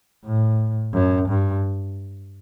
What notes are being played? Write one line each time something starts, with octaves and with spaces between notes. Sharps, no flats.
A2
F#2
G2